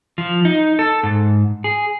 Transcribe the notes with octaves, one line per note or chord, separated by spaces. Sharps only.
F3
D#4
A4
G#2
G#4